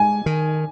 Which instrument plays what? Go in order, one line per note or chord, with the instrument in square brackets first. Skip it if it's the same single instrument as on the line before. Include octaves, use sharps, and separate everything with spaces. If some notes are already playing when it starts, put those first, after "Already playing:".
Already playing: [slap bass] G#3 [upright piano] G#5
[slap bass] D#3